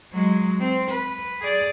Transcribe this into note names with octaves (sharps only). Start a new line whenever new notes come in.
F#3 G#3
C4
B4
G#4 D5